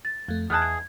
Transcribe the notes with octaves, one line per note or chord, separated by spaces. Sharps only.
A6
F2 A3
E2 B3 D#4 G#4 A5 F6 F#6 G#6
G#6